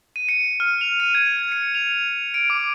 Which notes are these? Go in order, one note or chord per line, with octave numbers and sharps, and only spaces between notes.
D#7
C#7
F6
F7
D#7
G#6
C#7
F7
D7
D6